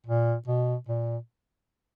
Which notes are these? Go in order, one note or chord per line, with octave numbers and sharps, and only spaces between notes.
A#2
B2
A#2